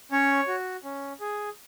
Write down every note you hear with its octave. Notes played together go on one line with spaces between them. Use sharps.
C#4 C#5
F#4
C#4
G#4